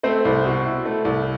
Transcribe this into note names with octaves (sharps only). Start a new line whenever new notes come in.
A3 C4 C5
C2
B2
E4
A3
C2